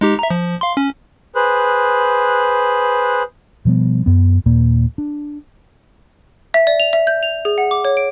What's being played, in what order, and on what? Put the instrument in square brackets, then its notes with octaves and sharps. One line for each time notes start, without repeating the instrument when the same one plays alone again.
[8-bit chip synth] G#3 D#4 G4
E5 A#5
F3
F5 C6
C#4
[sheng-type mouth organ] G#4 B4 C5 F#6
[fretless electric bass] B2 F3 G3 B3
F#2 B3
D#2 A#2 A#3
D4
[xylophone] E5
D5
F7
E5
G6
F7
G#4
F#5
D6
C#5
D7